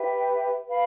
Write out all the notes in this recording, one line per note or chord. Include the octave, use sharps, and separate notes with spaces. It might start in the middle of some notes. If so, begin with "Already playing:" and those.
Already playing: G4 B4 E5 G5
B4 F5 B5